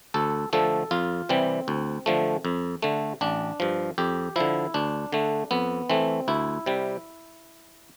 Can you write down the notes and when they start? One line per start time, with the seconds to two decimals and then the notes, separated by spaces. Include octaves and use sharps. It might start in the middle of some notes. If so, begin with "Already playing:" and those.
0.14 D2 A4
0.53 D3 F3 A3 A4
0.91 F2 F4
1.29 C3 E3 G3 C4
1.68 D2
2.06 D3 F3 A3
2.45 F2
2.82 D3 A3
3.21 A1 D4
3.60 G2 F3
3.98 F2 G4
4.36 D3 F3 E4
4.74 D2 D4
5.12 D3 A3
5.51 F2 B3
5.90 E3 A3 C4
6.28 D2 E4
6.66 C3 G3